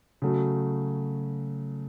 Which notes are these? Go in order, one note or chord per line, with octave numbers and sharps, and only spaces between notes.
C#3 F#3 A3